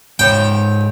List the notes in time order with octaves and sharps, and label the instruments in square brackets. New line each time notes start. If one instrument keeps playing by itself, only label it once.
[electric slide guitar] G#2 C#5 [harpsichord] G5